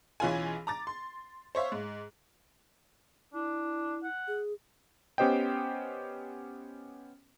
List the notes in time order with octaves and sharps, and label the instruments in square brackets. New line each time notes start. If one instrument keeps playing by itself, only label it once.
[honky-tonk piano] B1 E3 C#4 F4 G#4 G#5
A#5 D6 A6
C6
C5 C#5 E5 F5
G#2
[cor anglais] D4 [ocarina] E4
[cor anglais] F#5
[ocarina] G#4
[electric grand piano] B3 C#4 G4 C5 D#5 G5